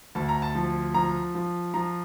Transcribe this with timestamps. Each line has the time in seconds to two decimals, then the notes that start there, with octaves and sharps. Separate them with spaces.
0.15 D2 A5
0.29 A#5
0.42 A5
0.55 F3
0.94 F3 A#5
1.35 F3
1.74 F3 A#5